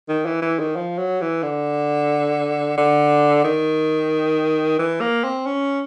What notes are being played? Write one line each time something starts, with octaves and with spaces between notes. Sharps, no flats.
D#3
E3
E3
D#3
F3
F#3
E3
D3
D3
D#3
E3
A#3
C4
C#4